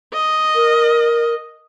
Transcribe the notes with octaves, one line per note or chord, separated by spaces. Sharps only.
D#5
A#4